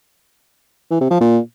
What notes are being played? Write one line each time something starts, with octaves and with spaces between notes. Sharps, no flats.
E3
C3
F3
A#2